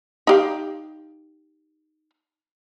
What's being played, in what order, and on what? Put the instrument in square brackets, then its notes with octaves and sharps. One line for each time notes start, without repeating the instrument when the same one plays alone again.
[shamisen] D#4 G4 F5